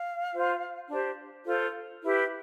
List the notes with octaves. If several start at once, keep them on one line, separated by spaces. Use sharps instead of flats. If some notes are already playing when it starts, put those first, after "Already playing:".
Already playing: F5
F4 C5
D4 G4 C5
F4 A4 C5
E4 G4 B4